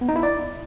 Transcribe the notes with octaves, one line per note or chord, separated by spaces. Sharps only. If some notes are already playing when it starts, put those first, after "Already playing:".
B3
D#4
E4
D5